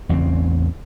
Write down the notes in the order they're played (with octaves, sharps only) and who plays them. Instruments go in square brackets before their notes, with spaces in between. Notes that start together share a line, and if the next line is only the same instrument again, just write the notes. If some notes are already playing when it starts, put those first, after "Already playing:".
[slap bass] A1 E2 C#3 C4